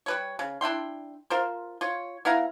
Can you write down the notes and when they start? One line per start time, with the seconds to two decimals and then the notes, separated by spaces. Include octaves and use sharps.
0.06 G3 B4 C#5
0.39 C#3
0.61 D4 E4 G5 C6
1.30 F4 A#4 C5
1.81 F4 C#5
2.25 B3 E4 F5 A#5